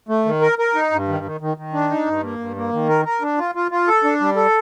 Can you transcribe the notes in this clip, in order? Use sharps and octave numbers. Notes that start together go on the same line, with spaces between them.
A3
D#3
A#4
A#4
D#4
G2
D#3
D#3
D#3
D#3
D4
D#4
G2
A#3
G2
A#3
D#3
A#4
A#4
D4
F4
F4
F4
A4
D4
G3
A4